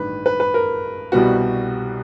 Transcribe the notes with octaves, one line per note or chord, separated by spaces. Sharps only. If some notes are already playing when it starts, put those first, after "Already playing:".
Already playing: A1 G2 D#3 B4
B4
B4
A#4
C2 B2 G3 B3 F#4